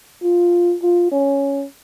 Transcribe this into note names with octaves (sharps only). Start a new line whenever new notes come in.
F4
F4
C#4